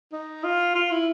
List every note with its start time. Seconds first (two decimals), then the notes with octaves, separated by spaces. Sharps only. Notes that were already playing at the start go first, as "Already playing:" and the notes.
0.12 D#4
0.44 F4
0.75 F4
0.91 E4